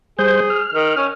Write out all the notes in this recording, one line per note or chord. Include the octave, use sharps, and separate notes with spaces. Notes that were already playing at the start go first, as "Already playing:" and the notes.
G3 G#4 C5 G6
F6
D#3
C#4